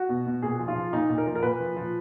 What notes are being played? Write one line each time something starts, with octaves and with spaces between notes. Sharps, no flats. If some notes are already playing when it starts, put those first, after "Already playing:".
Already playing: F#4
B2
B2
A#2 G#4
F3
F4
F3
A#2 D#4
A#2
A#4
F3
A#4
A#2 B4
F3
F3